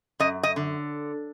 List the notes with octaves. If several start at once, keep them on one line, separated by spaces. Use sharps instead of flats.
F#2 D#5
D#5
D3